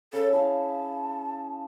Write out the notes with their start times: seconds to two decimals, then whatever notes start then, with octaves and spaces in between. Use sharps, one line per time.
0.13 C#3 A4
0.32 E4 G#4 F5 A5